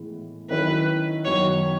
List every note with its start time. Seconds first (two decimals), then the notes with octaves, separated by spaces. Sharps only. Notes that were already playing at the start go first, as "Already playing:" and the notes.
Already playing: A2 E3 G#3 B3
0.50 D#3 F#3 C#4 E4 B4
1.25 F#2 D#3 F#3 B3 F#4 C#5